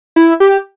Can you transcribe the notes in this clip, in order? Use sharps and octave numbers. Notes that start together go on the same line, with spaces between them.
E4
G4